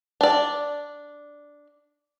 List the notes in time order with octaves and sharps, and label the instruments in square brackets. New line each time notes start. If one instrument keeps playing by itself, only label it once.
[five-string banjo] D4 D5